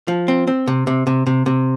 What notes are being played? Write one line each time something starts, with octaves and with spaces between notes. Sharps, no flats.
F3
C4
C4
C3
C3
C3
C3
C3